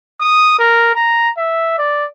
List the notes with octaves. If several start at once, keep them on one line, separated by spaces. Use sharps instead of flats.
D#6
A#4
A#5
E5
D5